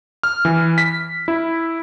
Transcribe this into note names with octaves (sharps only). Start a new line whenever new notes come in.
F6
E3
B6
E4